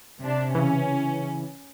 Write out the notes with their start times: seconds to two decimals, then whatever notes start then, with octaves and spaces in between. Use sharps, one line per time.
0.21 C3 D4
0.55 C#3 E3 C#4